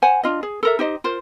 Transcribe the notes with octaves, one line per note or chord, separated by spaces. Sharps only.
C5 F#5 G#5
D4 F4 D#5
G#4
A4 A#4 E5
D#4 G4 C5 D#5
F4 A#4 C5